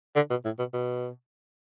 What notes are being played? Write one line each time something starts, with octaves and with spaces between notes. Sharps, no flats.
D3
B2
A2
B2
B2